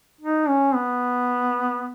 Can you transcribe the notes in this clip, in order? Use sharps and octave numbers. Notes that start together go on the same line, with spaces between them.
D#4
C#4
B3